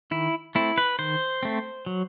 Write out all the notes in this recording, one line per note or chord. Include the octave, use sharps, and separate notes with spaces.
D#3 E4
A3 C4 E4
B4
D#3 C5
A3 C4
F#3